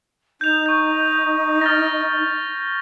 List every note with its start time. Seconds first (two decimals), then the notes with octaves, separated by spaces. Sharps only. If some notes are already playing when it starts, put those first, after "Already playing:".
0.41 D#4 G6 F7
0.66 C#6 G6
1.61 F6 A6 A#6